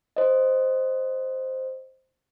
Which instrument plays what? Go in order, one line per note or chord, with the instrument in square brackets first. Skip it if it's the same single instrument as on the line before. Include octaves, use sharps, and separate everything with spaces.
[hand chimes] C5 D#5